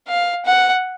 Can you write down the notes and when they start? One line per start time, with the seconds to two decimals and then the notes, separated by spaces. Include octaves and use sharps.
0.08 F5
0.45 F#5